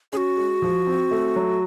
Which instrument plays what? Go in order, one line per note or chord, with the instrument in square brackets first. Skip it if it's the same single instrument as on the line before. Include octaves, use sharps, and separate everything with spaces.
[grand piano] C#4 [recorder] F#4 G#4
[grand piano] G#3
F3
C4
A3
F#3